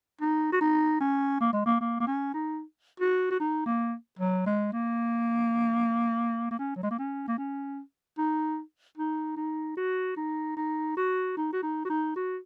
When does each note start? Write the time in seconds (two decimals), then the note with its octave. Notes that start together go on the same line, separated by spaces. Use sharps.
0.21 D#4
0.52 F#4
0.61 D#4
1.01 C#4
1.41 A#3
1.53 G#3
1.66 A#3
1.81 A#3
2.00 A#3
2.07 C#4
2.34 D#4
3.00 F#4
3.31 F#4
3.40 D#4
3.66 A#3
4.19 F#3
4.46 G#3
4.73 A#3
6.51 A#3
6.59 C#4
6.76 F#3
6.83 G#3
6.91 A#3
6.99 C#4
7.28 A#3
7.38 C#4
8.18 D#4
8.98 D#4
9.37 D#4
9.77 F#4
10.17 D#4
10.57 D#4
10.97 F#4
11.37 D#4
11.53 F#4
11.63 D#4
11.85 F#4
11.90 D#4
12.16 F#4